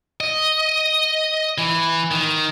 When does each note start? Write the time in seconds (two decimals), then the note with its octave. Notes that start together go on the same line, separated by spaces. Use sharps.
0.20 D#5
1.58 E3
2.11 D#3